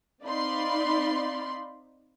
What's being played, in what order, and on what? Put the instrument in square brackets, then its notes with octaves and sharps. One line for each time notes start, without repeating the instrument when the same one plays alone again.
[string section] C4 D#4 D5 F5 B5 C6